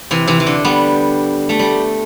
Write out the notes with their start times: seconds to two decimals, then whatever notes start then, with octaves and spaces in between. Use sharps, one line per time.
0.11 C3 E3
0.27 C3 E3
0.40 E3
0.46 D3
0.64 G3 B3
1.49 A3
1.59 G3